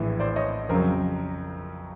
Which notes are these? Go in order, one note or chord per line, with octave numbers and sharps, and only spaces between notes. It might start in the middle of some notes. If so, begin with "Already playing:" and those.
Already playing: A#1 A2 E3
C5 D5
C#5 D#5
F2 C#3 F#3 A#4 C5